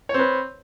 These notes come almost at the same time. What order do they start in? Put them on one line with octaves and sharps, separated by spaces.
C#5 C4 B4